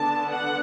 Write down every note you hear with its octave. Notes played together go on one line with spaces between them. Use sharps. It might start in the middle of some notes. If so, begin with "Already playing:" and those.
Already playing: D3 B3 D4 A5
F#5